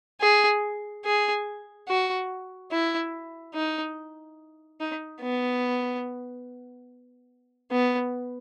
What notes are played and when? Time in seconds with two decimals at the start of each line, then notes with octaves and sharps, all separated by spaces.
0.21 G#4
1.05 G#4
1.88 F#4
2.72 E4
3.55 D#4
4.80 D#4
5.22 B3
7.71 B3